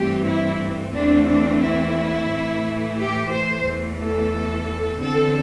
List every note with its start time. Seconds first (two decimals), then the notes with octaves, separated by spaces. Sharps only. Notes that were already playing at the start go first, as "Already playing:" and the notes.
Already playing: G2 E3 A3 C4 G4
0.26 E4
0.93 E2 E3 A3 C4 D4
1.27 D4
1.62 E4
2.28 A2 E3 A3
2.97 G4
3.30 C5
3.64 E2 E3 A3
3.99 A4
5.00 E2 D3 C4 A4